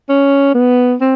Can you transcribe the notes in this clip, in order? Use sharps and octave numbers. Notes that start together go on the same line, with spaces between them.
C#4
B3
C4